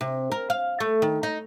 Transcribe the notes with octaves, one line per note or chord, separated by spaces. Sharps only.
C3
A#4
F5
A3
D#3
D#4